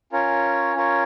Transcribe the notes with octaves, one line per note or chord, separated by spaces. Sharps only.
C#4 F4 A#4 C#5
C#4 F4 A#4 C#5